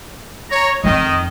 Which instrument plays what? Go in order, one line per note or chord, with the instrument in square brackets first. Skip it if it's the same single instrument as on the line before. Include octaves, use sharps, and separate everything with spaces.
[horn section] C#5 A#5
[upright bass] F2 [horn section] D#3 D#5